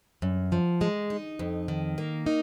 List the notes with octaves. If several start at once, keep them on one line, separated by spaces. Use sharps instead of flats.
F#2
F3
G#3
D#4
F2
D#3
A#3
D#4